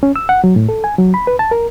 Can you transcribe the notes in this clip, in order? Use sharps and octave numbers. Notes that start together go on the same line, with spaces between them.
C#4
E6
F#5
F#3
A2
A4
G#5
F#3
B5
B4
A5
A#4